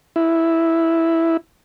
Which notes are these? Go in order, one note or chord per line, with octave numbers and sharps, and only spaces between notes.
E4